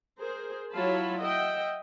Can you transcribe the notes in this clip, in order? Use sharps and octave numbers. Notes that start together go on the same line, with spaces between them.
G#4 A#4 C5
F#3 E4 F4 C#5 A5 B5
D#5 E5 F#5 G5